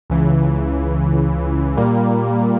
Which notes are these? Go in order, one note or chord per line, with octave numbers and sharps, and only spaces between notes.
C#2 C#3 E3
A#2 G3 A#3